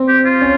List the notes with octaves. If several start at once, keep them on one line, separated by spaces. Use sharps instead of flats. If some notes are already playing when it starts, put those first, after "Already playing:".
Already playing: C4
G4
F4
C#4